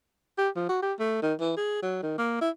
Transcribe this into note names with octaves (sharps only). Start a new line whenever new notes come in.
G4
F3
F#4
G4
A3
D#3
E3
G#4
F#3
D#3
A#3
E4